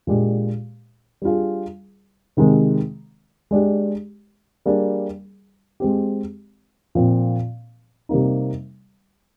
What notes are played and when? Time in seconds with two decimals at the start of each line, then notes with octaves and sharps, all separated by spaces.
0.07 A#2 G#3 D4 G4
1.22 G3 D4 F4 G#4
2.37 C3 D#3 G#3 C4
3.51 G#3 D4 G4
4.66 G3 A#3 D4 G#4
5.80 G#3 C4 G4
6.95 A#2 F3 C4
8.09 C3 G3 A#3 D#4